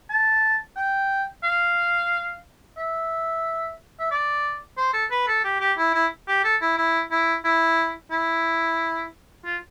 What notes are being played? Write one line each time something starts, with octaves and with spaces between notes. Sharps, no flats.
A5
G5
F5
E5
E5
D5
C5
A4
B4
A4
G4
G4
E4
E4
G4
A4
E4
E4
E4
E4
E4
F4